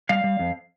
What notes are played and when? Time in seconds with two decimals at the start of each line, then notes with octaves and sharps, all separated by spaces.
0.09 G3 F5
0.24 G3
0.39 F2